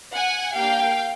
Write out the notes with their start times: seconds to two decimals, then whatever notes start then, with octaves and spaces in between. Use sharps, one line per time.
0.13 F#5 G#5
0.54 A#3 D4 G4 F5 G5